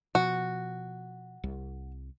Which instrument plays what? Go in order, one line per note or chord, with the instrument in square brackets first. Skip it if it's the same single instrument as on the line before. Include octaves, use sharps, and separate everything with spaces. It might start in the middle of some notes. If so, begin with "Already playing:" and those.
[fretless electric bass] B2 F3 [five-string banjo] F#4
[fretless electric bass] C2